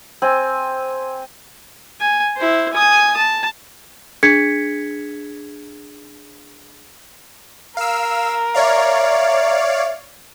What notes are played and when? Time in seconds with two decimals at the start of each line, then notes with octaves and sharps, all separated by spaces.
0.22 C4 G#5
2.01 G#5
2.37 E4 C5
2.73 G#5 D#6
3.17 A5
4.23 D4 G#4 G#6 B6 C#7
7.77 A#4 F5 E6
8.55 C#5 D5 E5 F5